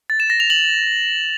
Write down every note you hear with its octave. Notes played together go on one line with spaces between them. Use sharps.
A6
E7
A#6
F7
F#7